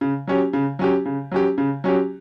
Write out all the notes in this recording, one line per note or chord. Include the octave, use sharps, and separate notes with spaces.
C#3
F#3 C#4 G4
C#3
F#3 C#4 G4
C#3
F#3 C#4 G4
C#3
F#3 C#4 G4